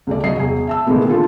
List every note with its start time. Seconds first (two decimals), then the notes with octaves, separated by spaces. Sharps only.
0.07 C#2 A3 D5
0.24 F#3 D#5 C7
0.35 E1 G#4
0.67 E5 A5 E6
0.86 A#2 D#3 E3 G#3 A3 B3
1.08 D3 F4 A4